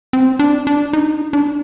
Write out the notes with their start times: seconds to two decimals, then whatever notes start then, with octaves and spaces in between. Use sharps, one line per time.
0.13 C4
0.39 D4
0.67 D4
0.93 D#4
1.33 D4